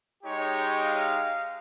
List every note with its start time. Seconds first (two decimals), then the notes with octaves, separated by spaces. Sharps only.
0.24 G#3 D#4 G4 C#5
0.84 F5